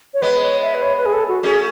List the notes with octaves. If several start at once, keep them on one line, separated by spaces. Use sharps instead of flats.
C#5
G#3 B3 B4
C#5
E5
B4
C#5
B4
G#4
A4
F#4
A3 C#4 G#4